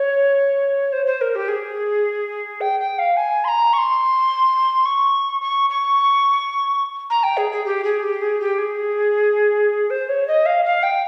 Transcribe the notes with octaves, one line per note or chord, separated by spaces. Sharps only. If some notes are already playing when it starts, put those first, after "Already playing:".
Already playing: C#5
C5
C5
A#4
G4
G#4
G5
G5
F5
G#5
C6
A#5
C#6
C6
C#6
C#6
C#6
A#5
G5
G#4
G#4
G4
G#4
G4
G#4
G4
G#4
C5
C#5
D#5
F5
F5
G5